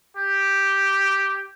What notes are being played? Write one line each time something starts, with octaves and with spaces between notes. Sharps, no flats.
G4